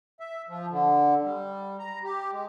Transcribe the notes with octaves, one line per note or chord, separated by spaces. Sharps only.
E5
F3
D3
G3
A#5
G4
G#3